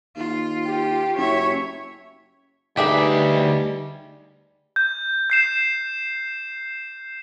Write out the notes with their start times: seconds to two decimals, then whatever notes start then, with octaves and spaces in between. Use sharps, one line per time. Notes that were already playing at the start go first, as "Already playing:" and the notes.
0.16 D#2 F4
0.67 G4
1.17 F#1 C#5 E5
2.77 D2 G3 D#4 G4 G#4 B4 E5
4.76 G6
5.30 G6 C7 E7